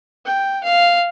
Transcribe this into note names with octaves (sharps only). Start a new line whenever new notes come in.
G5
F5